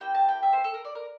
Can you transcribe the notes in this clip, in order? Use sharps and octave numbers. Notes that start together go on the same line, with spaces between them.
A#3 E4 G4 G5
A5
G5
E5
C5
A4
A#4
D5
A#4